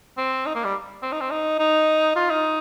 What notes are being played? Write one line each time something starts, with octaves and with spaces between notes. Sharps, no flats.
C4
D#4
A#3
G3
C4
D#4
C4
D#4
D#4
F4
D#4